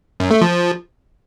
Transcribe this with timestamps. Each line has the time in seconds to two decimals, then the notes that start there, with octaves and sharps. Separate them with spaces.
0.20 F#2
0.31 A3
0.41 F3